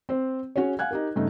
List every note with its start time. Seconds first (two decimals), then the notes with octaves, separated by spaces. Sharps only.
0.09 C4 C5
0.56 C#4 F#4 G#4 C#5
0.79 F5 F#5 G#5 F#6 G#6
0.91 D#4 G4 A#4
1.16 G2 C#3 A3 D#4